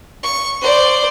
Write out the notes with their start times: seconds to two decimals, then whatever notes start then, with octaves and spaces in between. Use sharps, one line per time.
0.23 C#6
0.62 C5 D5